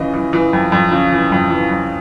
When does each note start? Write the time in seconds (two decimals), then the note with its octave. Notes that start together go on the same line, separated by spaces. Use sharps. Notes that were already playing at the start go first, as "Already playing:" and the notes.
Already playing: C#3 E3 D#5
0.14 E3
0.33 E3
0.53 F2
0.72 F2
0.92 C#3
1.12 E3
1.32 F2
1.50 E3
1.71 F2